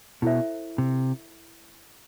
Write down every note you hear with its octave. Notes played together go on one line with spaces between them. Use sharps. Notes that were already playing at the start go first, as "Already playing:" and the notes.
B2 E4 A4 C5 E5
C3